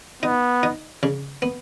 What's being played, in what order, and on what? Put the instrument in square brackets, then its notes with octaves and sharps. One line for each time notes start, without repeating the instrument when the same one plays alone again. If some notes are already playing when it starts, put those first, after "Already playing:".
[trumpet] B3 [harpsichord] D#4
[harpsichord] D#4
C#3
B3